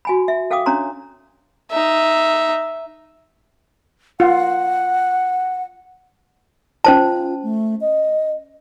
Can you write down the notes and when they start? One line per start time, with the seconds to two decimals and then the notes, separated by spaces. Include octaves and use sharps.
0.05 F#4 G#5 B5
0.28 E5
0.51 A4 F5 G5 D6 D#6
0.66 C#4 D4 C#5 A#5 C6
1.71 D#4 E5
4.20 F4 F#5
6.84 C#4 F4 C5 A5
7.43 A3
7.81 D#5